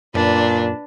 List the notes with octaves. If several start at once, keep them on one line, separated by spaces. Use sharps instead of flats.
F#2 A#2 D4 B4